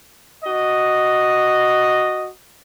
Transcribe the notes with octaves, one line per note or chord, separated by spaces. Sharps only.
F#4 D#5